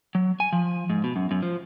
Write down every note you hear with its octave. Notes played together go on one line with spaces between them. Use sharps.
F#3
G#5
F3
G#2
B2
F#2
F#2
F3